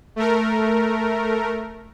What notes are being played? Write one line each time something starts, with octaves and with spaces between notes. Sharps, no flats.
A3 A#4